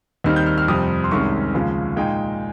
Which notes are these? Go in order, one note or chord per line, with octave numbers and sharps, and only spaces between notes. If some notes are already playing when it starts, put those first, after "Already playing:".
D#2 D#3 G3 C4 D#4 F6
G6
F6
F6
F2 C3 G3 C4 D#6
C6
C2 C3 D#3 G#3 C#4 C#6
D#2 C#3 F3 G#3
A#2 G#3 D#4 G5